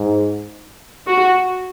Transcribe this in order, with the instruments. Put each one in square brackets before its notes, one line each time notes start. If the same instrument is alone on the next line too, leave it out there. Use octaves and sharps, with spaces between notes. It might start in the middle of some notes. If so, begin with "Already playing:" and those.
Already playing: [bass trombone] G#2
[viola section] F#4